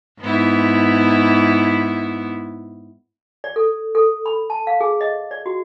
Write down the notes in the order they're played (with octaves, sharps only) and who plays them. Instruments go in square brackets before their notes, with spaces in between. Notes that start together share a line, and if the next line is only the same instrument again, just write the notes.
[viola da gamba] G#2 B3 E4
[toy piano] D5
A4
A4
B5
A5
F5
G#4
D#5
D5
F#4